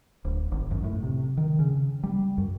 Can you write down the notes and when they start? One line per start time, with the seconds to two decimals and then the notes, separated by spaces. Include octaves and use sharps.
0.24 D1
0.52 G#1
0.71 F#2
0.84 A2
1.03 C3
1.37 D#3
1.59 C#3
2.04 G3
2.38 F#2